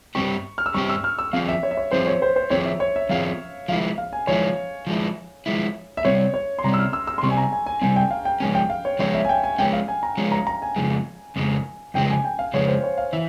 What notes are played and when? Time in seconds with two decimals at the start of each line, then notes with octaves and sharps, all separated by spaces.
0.15 G2 G3 C4 G4 C#6
0.58 F6
0.66 E6
0.74 G2 G3 C4 G4 C#6
0.89 E6
1.04 F6
1.19 E6
1.33 F3 C4 F4 G#4 F5
1.48 E5
1.63 C#5
1.71 E5
1.77 C#5
1.91 F3 C4 F4 G#4 C5
2.07 C#5
2.22 C5
2.36 C5
2.50 F3 C4 F4 G#4 C#5
2.65 E5
2.80 C#5
2.96 E5
3.09 F3 C4 F4 G#4 F5
3.68 F3 G#3 E4 F5
3.98 F5
4.13 G#5
4.27 F3 G#3 E4 C#5
4.87 F3 G#3 E4
5.46 F3 G#3 E4
5.97 E5
6.05 C3 G3 C4 C#5
6.34 C#5
6.59 C6
6.64 C3 G3 C4 A#5
6.74 E6
6.79 F6
6.93 E6
7.07 E6
7.18 C6
7.23 C3 G3 C4 C#6
7.30 G#5
7.37 A#5
7.52 G#5
7.66 G#5
7.82 C3 G3 C4 G#5
7.96 G5
8.11 F5
8.25 G5
8.40 F3 G#3 C#4 G#5
8.55 G5
8.70 F5
8.85 C#5
8.99 F3 G#3 C#4 C#5
9.14 E5
9.25 G#5
9.29 G5
9.44 G#5
9.58 F3 G#3 C#4 G5
9.73 F5
9.88 G#5
10.03 A#5
10.17 F3 G#3 C#4
10.32 A#5
10.47 A#5
10.62 G#5
10.76 F2 C#3 F3 G#3
11.36 F2 C#3 F3 G#3
11.94 F2 C#3 F3 G#3 G5
12.10 G#5
12.25 G5
12.39 F5
12.54 F2 C#3 F3 G#3 C#5
12.68 C5
12.84 C#5
12.98 F5
13.13 E3 E5